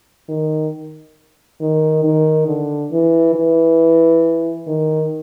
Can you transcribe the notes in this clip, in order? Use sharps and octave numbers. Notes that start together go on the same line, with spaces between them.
D#3
D#3
D#3
D3
E3
E3
D#3